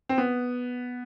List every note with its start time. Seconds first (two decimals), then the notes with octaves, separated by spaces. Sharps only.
0.09 C4
0.18 B3